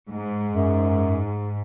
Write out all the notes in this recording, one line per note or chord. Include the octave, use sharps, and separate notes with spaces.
G#2
F#2